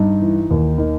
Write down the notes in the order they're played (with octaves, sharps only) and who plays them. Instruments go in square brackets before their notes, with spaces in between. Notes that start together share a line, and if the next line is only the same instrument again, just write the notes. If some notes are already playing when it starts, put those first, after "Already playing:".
Already playing: [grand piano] G2 D#4
E3
D#2
D#3